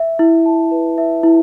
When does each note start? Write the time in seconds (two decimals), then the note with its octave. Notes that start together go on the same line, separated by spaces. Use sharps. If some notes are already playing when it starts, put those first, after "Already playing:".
Already playing: E5
0.19 E4
0.46 A5
0.71 B4
0.98 E5
1.23 E4